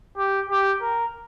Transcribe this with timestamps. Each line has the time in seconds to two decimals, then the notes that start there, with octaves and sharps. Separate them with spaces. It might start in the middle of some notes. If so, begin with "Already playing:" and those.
0.17 G4
0.50 G4
0.82 A#4